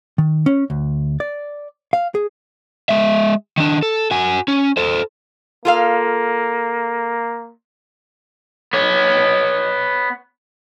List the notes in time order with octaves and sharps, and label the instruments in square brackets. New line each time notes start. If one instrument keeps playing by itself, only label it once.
[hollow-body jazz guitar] D#3
C#4
D2
D5
F5
G#4
[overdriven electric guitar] G#3 E5
D#3 D4
A4
F#4 G#5
C#4
A4 C5
[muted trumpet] A#3 [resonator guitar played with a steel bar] F4 A4 F5
[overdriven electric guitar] B3 C#5